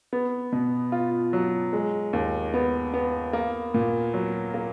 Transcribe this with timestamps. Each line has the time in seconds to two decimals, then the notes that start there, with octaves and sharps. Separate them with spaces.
0.13 B3
0.52 B2
0.92 F4
1.33 F#3
1.73 G#3
2.13 D#2
2.54 B3
2.94 B3
3.33 A#3
3.74 A#2
4.14 F#3
4.54 A#3